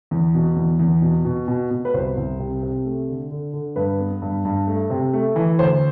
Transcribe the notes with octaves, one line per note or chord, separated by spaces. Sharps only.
E2
B2
E2
E2
B2
B2
B2
B2
B4
C2 C5
C2
C3
C3
A3
D3
D3
D3
G2 B4
B3
G2
G2
A3
C3
A3
E3
D2 C5